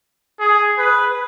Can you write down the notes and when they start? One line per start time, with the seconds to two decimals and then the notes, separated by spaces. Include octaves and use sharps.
0.40 G#4
0.79 B4